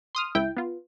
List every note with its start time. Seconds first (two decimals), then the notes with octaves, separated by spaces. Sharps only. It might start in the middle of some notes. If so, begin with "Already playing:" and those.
0.15 C6 D#6 F6
0.35 C#2 E4 G5
0.57 B3 F4